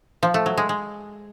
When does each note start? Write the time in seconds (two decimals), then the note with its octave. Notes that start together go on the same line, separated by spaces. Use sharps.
0.23 F3
0.34 A3
0.46 F#3
0.57 G#3
0.69 G#3